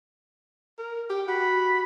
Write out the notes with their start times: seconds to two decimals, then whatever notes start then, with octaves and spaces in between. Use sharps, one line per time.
0.78 A#4
1.10 G4 G5
1.28 F#4 B5